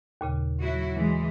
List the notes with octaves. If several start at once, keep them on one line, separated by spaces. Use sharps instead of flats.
D#2 A#2 C#3
F#3 E4 F#4
E3 G#3